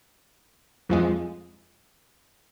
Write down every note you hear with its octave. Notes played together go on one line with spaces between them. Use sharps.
F2 F3 G#3